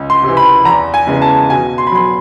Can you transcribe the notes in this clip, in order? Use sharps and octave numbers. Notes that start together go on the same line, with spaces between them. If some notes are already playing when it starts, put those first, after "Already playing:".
Already playing: C#2
C6
C3
E3
B5
E2 A#5
G#5
C#3 E3 G#3 B3
A5
B2 G#5
C6
B5
F#3 B3 C6